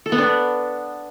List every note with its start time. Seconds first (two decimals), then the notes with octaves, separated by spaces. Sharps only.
0.06 A4
0.12 B3
0.18 D4